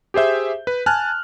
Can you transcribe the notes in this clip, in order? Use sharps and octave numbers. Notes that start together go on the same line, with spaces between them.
G4 G#4 C5 E5 G6
B4
G#5 A5 F6 F#6